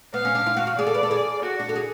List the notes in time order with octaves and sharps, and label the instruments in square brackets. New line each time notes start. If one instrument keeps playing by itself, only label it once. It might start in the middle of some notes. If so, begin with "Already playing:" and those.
[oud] B3 [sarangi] F5
[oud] C#4
D4
F4
F#4
F#4
[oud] G#4 [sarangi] D5
[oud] A4
B4
A4
G#4
[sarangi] F#4
[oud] D4
A4
G#4